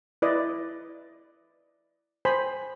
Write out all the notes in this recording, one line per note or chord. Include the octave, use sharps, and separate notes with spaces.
E4 B4 D5 D#5
C5 G#5 B5